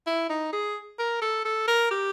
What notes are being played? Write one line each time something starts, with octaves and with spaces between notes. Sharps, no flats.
E4
D#4
G#4
A#4
A4
A4
A#4
G4